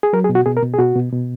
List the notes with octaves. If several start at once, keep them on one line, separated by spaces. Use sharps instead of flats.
G#4
F#3 A#4
G#4
B2
F#4
B2 G#4
A#4
B2
G#4
B2 F#4
B2
B2